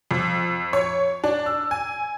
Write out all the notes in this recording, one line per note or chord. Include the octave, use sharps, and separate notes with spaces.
F2
C#5
D4
E6
G#5